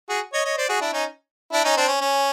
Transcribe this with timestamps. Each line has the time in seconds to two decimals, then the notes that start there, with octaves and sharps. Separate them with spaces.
0.09 F#4 G#4
0.33 C#5 D#5
0.44 C#5 D#5
0.57 C5 D5
0.69 F#4 G#4
0.81 D4 E4
0.93 C#4 D#4
1.52 D4 E4
1.64 C#4 D#4
1.77 C4 D4
1.88 C#4
2.01 C#4